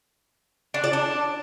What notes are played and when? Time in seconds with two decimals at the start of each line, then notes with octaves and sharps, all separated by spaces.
0.74 D4
0.84 D5
0.93 D4